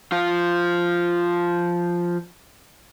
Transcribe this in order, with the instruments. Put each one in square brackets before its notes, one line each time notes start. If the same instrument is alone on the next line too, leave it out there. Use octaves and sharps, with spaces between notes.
[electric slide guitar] F3 F4